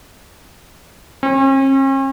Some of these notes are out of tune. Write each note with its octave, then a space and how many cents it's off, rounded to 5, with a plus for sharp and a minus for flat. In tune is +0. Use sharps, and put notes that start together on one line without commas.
C#4 -45